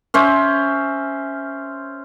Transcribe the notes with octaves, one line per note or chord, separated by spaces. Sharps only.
C#4 C5 E5